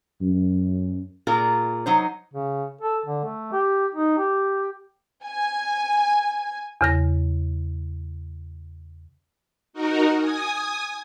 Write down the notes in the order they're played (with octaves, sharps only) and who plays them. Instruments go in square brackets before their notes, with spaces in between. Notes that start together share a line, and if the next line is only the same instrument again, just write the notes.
[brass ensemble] F#2
[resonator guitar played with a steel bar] A#2 F4 G#4 A#4
F#3 D#4 C5
[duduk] C#3
A4
D3
A3
G4
D#4
G4
[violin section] G#5
[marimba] E2 C#3 A#6
[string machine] D#4 F#4 A#4
G#5 D#6